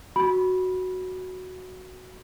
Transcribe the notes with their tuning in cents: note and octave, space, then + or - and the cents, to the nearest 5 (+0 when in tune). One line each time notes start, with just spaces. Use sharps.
F#4 +0 B5 -10